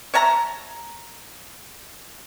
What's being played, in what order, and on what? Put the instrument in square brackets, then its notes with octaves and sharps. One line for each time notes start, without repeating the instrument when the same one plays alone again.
[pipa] C#5 E5 A5 A#5